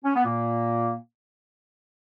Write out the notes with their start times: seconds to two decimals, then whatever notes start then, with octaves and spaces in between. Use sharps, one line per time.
0.04 C#4
0.15 B3
0.25 A#2 A#3